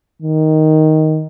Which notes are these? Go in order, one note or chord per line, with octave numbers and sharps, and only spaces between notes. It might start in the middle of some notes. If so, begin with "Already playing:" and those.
D#3